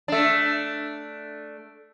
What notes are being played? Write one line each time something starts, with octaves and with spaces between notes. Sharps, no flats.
A3 D4